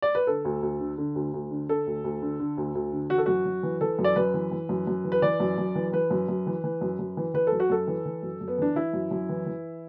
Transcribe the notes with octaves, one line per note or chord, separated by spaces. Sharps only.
D5
B4
D3 A4
D2
D2
D3
D3
D2
D2
D3
D3 A4
D2
D2
D3
D3
D2
D2
D3
E3 F#4
A4
F#2 F#4
F#2
E3
E3 A4
F#2
D5
F#2 B4
E3
E3
F#2
F#2
E3
B4
E3 D5
F#2
F#2
E3
E3 B4
F#2
F#2
E3
E3
F#2
F#2
E3
E3 B4
A4
F#2
F#4
F#2 A4
E3
E3
F#2
F#2
B3
E3 D4
E3 E4
F#2
F#2
E3
E3